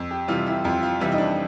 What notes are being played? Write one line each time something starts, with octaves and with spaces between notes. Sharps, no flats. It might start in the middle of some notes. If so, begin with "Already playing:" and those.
Already playing: F2
G4
C3 E3 G3 F4
E4
F2 F4
F4
C3 E3 G3 E4
D#4
D4